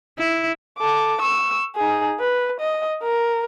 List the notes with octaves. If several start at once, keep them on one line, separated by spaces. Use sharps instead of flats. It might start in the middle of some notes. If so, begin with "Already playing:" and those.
E4
A4 D6
C#6 E6
D#4 G#4
B4
D#5
A#4